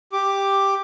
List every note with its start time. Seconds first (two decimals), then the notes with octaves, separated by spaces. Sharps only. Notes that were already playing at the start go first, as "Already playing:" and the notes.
0.13 G4 D6